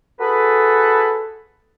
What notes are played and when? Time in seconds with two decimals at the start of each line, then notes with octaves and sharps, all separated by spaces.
0.21 F#4 G#4 A4 B4